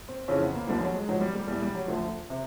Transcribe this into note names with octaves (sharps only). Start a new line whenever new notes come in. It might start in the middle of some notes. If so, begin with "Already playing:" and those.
C4
F2 C#3 E3 C#4
B3
A#3
D#2 D3 F3 G3
F#3
G#3
G#2 F3 F#3
G3
G3
E2 B2 G3
G3
F#3
D2 D3 F3
C3